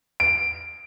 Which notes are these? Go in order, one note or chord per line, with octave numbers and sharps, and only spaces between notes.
D7